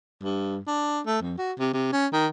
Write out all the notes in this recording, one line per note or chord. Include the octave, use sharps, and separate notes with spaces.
G2
D4
A3
F2
F#4
C3
C3
C#4
D#3